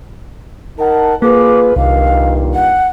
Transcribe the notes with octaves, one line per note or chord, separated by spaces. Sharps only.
D#4 A#4 F#5 A5
A#3 F4 G#4 B4 D6
C2 G2 A#2 D#3 F5
F#5